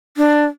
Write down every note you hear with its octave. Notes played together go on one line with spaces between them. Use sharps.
D4